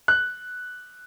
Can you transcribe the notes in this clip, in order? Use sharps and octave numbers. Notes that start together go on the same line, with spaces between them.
F#6